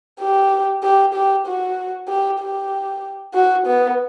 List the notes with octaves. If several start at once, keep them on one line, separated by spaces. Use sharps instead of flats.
G4
G4
G4
F#4
G4
G4
F#4
B3